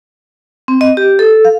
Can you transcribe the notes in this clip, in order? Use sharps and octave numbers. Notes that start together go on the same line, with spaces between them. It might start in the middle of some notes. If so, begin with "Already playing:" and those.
C4
D#5
G4
A4
F5